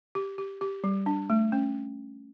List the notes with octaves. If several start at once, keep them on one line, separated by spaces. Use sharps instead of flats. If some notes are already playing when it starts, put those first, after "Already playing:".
G4
G4
G4
G3
D4
A3
C#4